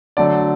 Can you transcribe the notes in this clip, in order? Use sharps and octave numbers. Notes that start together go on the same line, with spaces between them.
D3 F#3 A3 D5